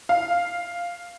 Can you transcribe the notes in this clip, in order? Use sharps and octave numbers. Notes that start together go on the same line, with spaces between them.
F5